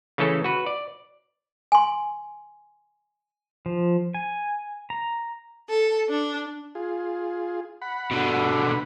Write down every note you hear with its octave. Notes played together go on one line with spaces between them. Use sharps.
C#3 E3 A3 C#4 A4
F#4 B4
D5
G#5 C6
F3
G#5
A#5
A4
D4
F4 G#4
F#5 B5
B2 D3